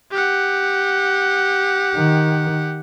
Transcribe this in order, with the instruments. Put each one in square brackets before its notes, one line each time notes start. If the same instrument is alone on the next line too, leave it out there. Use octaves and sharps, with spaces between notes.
[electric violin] G4 F#5
[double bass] D#3